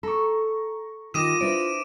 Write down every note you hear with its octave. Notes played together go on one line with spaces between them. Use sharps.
A4 A#5 C#6
D#3 F4 G4 D6 D#6 A#6 D#7 E7
D4 E4 B4 C5 D7